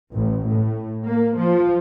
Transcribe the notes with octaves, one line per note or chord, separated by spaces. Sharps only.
A1
A2
A#3
F3